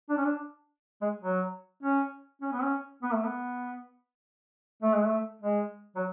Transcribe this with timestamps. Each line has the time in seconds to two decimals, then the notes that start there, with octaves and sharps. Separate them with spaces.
0.09 D4
0.17 C#4
0.25 D4
1.02 G#3
1.22 F#3
1.83 C#4
2.42 C#4
2.52 B3
2.63 C#4
3.03 B3
3.13 A3
3.25 B3
4.83 A3
4.94 G#3
5.06 A3
5.42 G#3
5.96 F#3